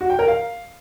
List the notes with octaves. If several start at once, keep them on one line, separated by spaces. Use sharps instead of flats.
F#4
G5
A#4
F5